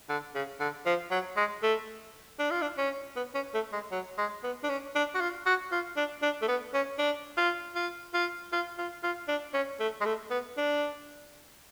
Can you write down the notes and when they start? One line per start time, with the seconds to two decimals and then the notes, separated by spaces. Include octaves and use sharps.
0.09 D3
0.35 C#3
0.60 D3
0.86 F3
1.11 F#3
1.37 G#3
1.63 A3
2.39 D4
2.51 F4
2.61 D4
2.78 C#4
3.16 B3
3.35 C#4
3.54 A3
3.73 G#3
3.92 F#3
4.18 G#3
4.43 B3
4.64 D4
4.69 C#4
4.95 D4
5.14 F#4
5.21 F4
5.46 F#4
5.72 F4
5.97 D4
6.22 D4
6.42 A3
6.48 B3
6.74 C#4
6.98 D4
7.37 F4
7.75 F4
8.14 F4
8.52 F4
8.78 F4
9.03 F4
9.28 D4
9.54 C#4
9.80 A3
10.01 G#3
10.06 A3
10.30 B3
10.57 D4